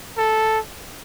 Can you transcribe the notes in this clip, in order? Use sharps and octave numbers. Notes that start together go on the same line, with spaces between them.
A4